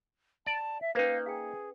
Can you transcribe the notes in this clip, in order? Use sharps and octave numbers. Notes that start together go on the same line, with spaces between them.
D5 A5
E5
A#3 C#4 D#4 B4 C5 F5
G#4 F5 G5